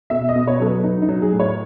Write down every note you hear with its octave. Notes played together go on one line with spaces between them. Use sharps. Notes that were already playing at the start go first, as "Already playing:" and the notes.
B2 E5
D#5
B2
C#5
F#3 A4
B4
F#3 D#4
D#4
F#3
G#4
A2
C#5